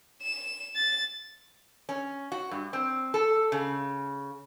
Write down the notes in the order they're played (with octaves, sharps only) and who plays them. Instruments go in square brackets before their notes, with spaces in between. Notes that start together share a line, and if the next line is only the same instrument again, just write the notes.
[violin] E7
A6
[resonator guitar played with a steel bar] C#4
F#4
G2
C4
A4
C#3